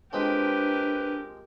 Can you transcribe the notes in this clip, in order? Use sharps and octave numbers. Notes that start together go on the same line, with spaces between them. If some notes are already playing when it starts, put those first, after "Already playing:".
F3 G#3 C4 D4 G4 A#4 B4